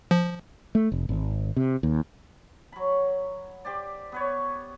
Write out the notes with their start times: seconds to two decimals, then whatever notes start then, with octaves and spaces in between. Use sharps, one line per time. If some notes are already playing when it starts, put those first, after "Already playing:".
0.11 F3
0.75 A3
0.92 F1
1.09 G#1
1.56 C3
1.83 D#2
2.72 F#3 B5
3.65 G4 C5 D5
4.12 B3 B4 C#5